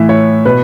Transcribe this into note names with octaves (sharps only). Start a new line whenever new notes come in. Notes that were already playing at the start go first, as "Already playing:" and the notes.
Already playing: A2 E3 E5
C#5
B2 B4